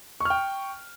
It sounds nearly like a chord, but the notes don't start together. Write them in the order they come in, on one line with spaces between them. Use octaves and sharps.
C#6 F6 G5